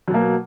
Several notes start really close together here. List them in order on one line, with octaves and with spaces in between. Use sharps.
F#3 B2 A#3